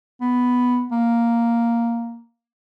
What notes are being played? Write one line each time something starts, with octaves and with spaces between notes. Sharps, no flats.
B3
A#3